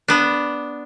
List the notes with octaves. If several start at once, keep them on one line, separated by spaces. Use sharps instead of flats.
B3 D4